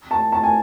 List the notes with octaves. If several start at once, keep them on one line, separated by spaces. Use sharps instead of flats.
A5
A5
G#5